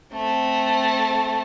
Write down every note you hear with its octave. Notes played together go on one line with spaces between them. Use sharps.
A3 C4